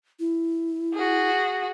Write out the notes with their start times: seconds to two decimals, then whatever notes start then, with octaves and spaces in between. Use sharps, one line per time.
0.20 E4
0.94 F#4 G#4